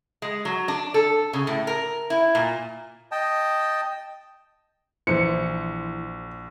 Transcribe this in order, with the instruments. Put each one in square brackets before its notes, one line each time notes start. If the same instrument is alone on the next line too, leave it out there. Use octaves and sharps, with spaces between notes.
[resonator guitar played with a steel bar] G#3
F#3
D4
A4
C#3
A2
A#4
E4
A#2
[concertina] D#5 G5 A5
[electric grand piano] A#1 [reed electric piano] E3 E4 [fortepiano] C5 [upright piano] C#7